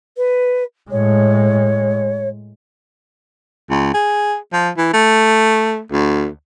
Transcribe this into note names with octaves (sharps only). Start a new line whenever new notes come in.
B4
A2 G#3 C#5
C#2
G#4
F3
E3
A3
D2